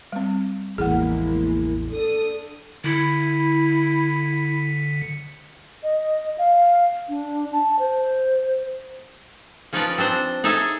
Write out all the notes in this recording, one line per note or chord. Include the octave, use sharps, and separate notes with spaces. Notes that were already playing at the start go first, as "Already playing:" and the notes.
G3 C4
A1 E2 F3 G#3 A#3 E4 G#4 F#5
D4 A4 D#6
D3 E4 B6 C#7
D#5
F5
D4
A5
C5
F3 C#4 D#4 B4 C#5 D5
C4 D4 C5 A#5
D#4 G#4 A4 C#5 E5